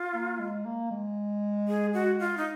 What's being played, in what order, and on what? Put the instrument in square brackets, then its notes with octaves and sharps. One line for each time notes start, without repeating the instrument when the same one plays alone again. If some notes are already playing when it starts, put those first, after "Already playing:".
Already playing: [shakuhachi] F4
[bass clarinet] A#3
G#3
A#3
G#3
[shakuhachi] G#4
F#4
F4
D#4